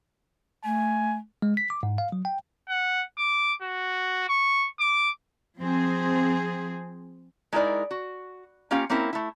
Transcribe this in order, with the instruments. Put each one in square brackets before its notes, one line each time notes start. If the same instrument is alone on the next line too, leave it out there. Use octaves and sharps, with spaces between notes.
[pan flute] A3 [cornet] G#5
[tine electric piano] G#3
B6
D6
G#2
F5
F#3
G5
[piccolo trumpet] F#5
D6
F#4
C#6
D6
[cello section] F3 C4 G#4
[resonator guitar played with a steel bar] G#3 D#4 E4 A#4 D5
F#4
A#3 C#4 F4 G4 F5
A#3 C4 C#4 E4 A#4
A3 E4